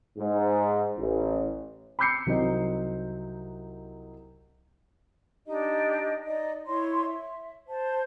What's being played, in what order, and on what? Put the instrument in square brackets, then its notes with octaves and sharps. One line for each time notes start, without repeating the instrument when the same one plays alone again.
[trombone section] G#2
A1
[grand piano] B5 D6 E6 G6 C7 C#7
C2 F#3 C4 D#4
[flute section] D4 D#4 G4 D#5
D#4 D5 D#5
E4 C#5 C6
E5
C5 A5